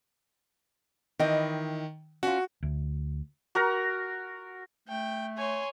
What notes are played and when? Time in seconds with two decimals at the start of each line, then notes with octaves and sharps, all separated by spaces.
1.19 D#3 E3 D#5 G5
2.23 C#4 F4 F#4
2.63 D2
3.55 F#4 A#4 A#5
4.88 A3 G5
5.37 C#5 G#5 C6